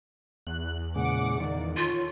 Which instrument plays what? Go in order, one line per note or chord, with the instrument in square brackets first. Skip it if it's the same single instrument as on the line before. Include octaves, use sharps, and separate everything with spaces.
[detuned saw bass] E2 [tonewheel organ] F#6
[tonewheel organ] A#2 C#3 G#3 [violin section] F#5 D6 C#7
[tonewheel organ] D#3 [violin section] A#3 D5
[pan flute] F4 [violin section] A4 C#5